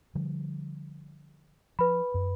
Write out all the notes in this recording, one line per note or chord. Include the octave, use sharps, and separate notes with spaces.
D3 F3 G3
F3 B4 B5
F#2